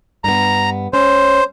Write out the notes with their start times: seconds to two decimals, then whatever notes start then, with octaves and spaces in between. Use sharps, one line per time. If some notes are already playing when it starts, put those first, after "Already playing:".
0.24 G2 B3 A#5
0.93 C#4 C5